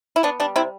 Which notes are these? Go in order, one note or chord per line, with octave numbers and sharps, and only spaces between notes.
E4
B3 D4
G3 D4
C3 C4 E4